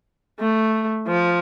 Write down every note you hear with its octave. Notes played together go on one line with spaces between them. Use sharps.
A3
F3